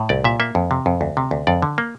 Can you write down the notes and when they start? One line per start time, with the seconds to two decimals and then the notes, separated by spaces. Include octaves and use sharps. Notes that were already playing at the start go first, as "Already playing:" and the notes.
Already playing: A2
0.09 C2 D5
0.24 A#2 E5
0.40 A#3 E5
0.55 F2
0.71 C3
0.86 F2
1.01 D2
1.17 C3
1.31 D2
1.47 F2 D5
1.62 D3
1.78 A#3